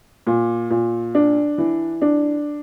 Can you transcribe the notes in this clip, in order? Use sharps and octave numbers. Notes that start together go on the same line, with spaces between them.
A#2
A#2
D4
E3
D4